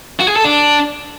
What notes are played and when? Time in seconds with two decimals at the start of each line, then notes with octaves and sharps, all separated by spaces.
0.20 F#4
0.28 G#4
0.36 A4
0.44 D4